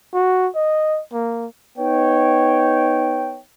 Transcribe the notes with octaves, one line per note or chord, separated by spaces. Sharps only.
F#4
D#5
A#3
B3 D#4 C#5 G5